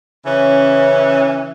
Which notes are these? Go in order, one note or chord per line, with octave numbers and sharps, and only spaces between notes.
C#3 E3 C#4